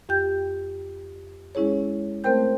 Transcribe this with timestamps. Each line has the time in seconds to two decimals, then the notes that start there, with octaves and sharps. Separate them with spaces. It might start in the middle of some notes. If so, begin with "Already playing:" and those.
0.09 F2 G4 G5 G6
1.55 G#3 C#4 E4 G#4 C#5
2.24 A3 C4 A#4 C5 G5 G6